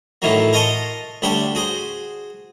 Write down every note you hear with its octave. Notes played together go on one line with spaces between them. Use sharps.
A2 D#3 E3 F#3 A#3
A#4 D#5 G#5 A5 C6 C#6
D2 G3 D4 G4 C#5 F#5
F#4 G#4 C5